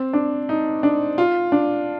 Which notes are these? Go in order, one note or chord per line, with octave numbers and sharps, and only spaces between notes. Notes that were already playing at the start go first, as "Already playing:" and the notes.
Already playing: C4
D4
D#4
D4
F4
D4